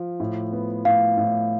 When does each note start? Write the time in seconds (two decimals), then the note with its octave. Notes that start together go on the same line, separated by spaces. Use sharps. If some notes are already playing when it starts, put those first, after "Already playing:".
Already playing: F3
0.20 A2
0.52 B3
0.85 A2 F5
1.17 A2